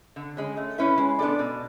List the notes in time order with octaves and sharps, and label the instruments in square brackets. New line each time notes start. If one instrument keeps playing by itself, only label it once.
[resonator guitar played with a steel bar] D3
G#3 C#4
A3
C#4 E4 B4
G#3
B3 D4 A4 D5
B2